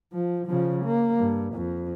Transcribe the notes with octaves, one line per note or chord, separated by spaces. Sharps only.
F3
C#3 F3
A#3
G2
F2